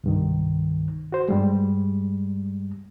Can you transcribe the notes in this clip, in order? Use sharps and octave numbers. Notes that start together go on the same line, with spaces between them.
C2 G2 D#3
F#4 C5
G2 G3 G#3